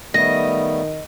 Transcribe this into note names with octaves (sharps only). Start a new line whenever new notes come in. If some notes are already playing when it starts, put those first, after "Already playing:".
D#3 G3 A3 B3 D#5 A#6